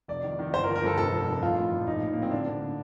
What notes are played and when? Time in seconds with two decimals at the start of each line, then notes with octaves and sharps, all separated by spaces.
0.08 F1 D5
0.24 D#3
0.39 D#3
0.53 G1 C5
0.64 A#4
0.68 F3
0.75 A#4
0.83 G2 A4
0.98 F1 A4
1.12 F1
1.27 F1
1.42 A#1 F4
1.58 A2
1.72 A#1
1.86 A#1 D#4
2.01 A2
2.13 A2 A#3
2.22 C4
2.31 D3 D4
2.47 D3